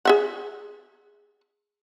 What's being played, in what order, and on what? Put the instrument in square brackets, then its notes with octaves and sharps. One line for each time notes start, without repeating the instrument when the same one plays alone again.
[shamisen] G#4 E5 F#5